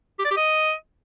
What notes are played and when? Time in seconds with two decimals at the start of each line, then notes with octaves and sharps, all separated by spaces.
0.19 G4
0.25 D5
0.31 G4
0.37 D#5